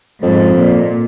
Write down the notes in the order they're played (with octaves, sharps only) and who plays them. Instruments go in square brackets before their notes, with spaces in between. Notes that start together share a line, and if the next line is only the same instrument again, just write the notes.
[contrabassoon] F2 [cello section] G#2
[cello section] A#2